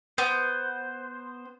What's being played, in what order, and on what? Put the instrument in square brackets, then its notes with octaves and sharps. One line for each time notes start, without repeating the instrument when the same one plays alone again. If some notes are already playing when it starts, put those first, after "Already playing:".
[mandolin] B3 [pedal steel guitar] C5